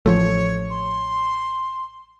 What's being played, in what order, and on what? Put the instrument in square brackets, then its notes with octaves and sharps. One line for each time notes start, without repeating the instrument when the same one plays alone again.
[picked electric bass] A1 F3 A3 [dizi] C#5
[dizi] C6